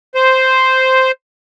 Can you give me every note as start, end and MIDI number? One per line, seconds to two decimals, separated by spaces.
0.15 1.11 72